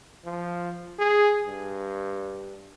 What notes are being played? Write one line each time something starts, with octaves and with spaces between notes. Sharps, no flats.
F3
G#4
G2